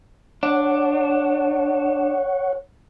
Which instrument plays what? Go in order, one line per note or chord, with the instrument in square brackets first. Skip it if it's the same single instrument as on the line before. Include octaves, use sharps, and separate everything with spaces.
[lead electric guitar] D4 [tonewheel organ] C#5 F#5